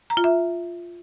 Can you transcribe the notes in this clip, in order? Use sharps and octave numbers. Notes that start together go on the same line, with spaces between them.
A#5
F4
E5